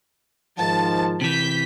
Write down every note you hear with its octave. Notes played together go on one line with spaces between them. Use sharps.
G#2 D#3 F3 A5
C3 E3 G6 B6